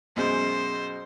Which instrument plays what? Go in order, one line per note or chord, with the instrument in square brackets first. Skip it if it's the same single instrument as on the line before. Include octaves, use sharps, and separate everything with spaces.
[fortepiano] F#2 B2 G#3 [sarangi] C5